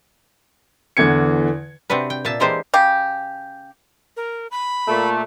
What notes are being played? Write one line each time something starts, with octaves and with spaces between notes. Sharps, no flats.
E2 D3 E3 G#6 C#7
C3 C4 D4 F#4 B4
G5
A#2 D4 E5 A5
E3 G#3 A#3 D4 G4 C5
C#3 G4
A#4
B5
A#2 A3